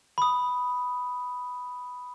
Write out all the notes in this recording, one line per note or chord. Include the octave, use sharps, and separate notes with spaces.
B5 D#6